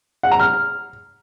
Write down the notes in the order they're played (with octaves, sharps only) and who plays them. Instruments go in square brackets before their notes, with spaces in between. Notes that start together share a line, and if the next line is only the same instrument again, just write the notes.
[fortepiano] F#5
A#5
F6